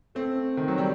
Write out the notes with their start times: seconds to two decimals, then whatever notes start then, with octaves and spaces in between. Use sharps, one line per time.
0.15 A3 C4
0.57 D#3
0.68 F#3
0.78 G3